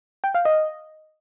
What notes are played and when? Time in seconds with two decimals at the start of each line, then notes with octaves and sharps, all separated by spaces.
0.24 G5
0.35 F5
0.45 D#5